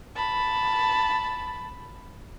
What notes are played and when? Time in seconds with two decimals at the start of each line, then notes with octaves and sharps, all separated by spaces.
0.16 A5 B5